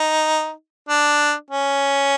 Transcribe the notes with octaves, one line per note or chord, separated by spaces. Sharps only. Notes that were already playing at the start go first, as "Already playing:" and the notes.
Already playing: D#4
D4
C#4